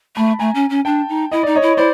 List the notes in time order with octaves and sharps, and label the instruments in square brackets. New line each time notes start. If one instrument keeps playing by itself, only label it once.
[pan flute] A3 [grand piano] A5 B5
[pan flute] A3 [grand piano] G#5 A#5
[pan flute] C#4
C#4
[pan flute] D4 [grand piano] G5 A5
[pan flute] D#4
[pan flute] E4 [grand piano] D#5
[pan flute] D#4 [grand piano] D5
[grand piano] C#5 D#5
[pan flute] E4
[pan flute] E4 [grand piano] C5 D5